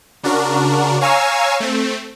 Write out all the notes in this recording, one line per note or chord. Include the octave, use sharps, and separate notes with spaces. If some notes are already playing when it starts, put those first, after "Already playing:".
C#3 D4 F#4 A#4
C#5 F5 G#5 A#5 C#6 E6
A3 C4